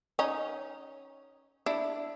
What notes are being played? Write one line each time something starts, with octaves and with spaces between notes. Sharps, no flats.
C#4 D#4
D4 E4